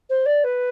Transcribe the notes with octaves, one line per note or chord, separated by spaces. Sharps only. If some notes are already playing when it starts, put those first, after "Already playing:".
C5
D5
B4